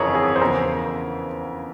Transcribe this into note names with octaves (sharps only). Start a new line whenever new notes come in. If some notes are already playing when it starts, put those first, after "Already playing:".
Already playing: G1 F2 C#3 E3 G#4 A#4 C#5
G#4
C5
E2 C#3 F3 A#4